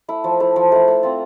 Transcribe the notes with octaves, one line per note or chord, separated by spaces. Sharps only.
A3 E4
F3
A3 E4
F3
A3 E4
A3
C4 F4